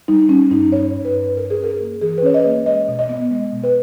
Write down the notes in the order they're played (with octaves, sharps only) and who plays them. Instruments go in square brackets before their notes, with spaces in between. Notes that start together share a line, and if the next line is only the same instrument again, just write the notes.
[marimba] G3 D#4
G3 C#4
G2 D#4
G2 C#5
G2
B4
G2
G2 A#4
G#4
C#4 A#4
A#3
E3 G#4
B4
C#4 C#5
D#5
A#3
G#3 D#5
B2
D#5
B3
G#3
B2
B4